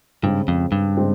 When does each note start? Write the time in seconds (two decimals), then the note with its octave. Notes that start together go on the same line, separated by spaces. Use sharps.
0.23 G2 C#3 G#3 C4
0.48 F2
0.72 G2
0.97 C#3 G#3 C4